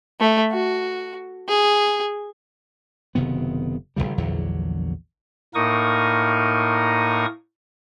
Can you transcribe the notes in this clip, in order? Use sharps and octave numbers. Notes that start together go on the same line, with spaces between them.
A3
F#4
G#4
F#1 C3 D#3 B3
G#1 D#2 C#3 G3
A#1 E2 D3 F#3
A2 A#3 D#4 A#4 C#6 D#6